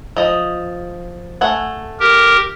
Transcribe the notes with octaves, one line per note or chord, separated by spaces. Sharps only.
F3 D#5
A3 F#5 G#5
G4 A#4